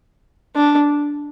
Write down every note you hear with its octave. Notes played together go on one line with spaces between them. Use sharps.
D4